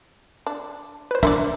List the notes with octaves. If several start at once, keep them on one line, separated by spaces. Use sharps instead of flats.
D4
B4 C5
D4 A#4 C5 D5 E5